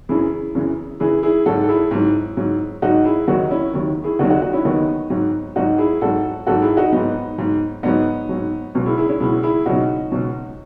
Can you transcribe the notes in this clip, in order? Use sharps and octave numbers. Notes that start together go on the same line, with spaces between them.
F#2 C#3 E3 E4 G#4
F#2 C#3 E3
F#2 C#3 E3 E4 G#4
E4 G#4
G#2 F#3 F#4 A4
A4
E4 G#4
G#2 F#3
G#2 F#3
G#2 F#3 D#4 F#4
E4 G#4
D#2 D#3 F#3 D#4 F#4
C#4 E4
D#2 D#3 F#3
E4 G#4
D#2 D#3 F#3 D#4 F#4
D#4 F#4
D#4 F#4
C#4 E4
D#2 D#3 F#3 B3 D#4
G#2 F#3
G#2 F#3 D#4 F#4
E4 G#4
G#2 F#3 F#4 A4
G#2 F#3 F#4 A4
E4 G#4
D#4 F#4
G#2 F#3 B3 D#4
G#2 F#3
G#2 F#3 B3 D#4
G#2 F#3
C#2 B2 F#3
E4 G#4
E4 G#4
C#4 E4
C#2 B2 F#3 E4 G#4
E4 G#4
C#2 B2 F#3 D#4 F#4
C#2 B2 F#3